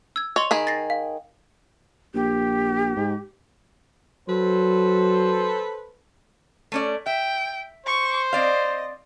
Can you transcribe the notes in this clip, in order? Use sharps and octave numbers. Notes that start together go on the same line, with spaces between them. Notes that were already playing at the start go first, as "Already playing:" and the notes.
E6 G#6
C#5 D#5 C6
D#3 G#4 B5
A6 A#6 C7
F5
A#1 G4
G#2
F#3 A4 B4 C5
A3 C#4 D5
E5 G5
C5 C#6
C4 D5 D#5 F5